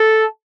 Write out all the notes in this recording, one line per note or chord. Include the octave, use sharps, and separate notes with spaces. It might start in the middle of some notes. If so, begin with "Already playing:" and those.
Already playing: A4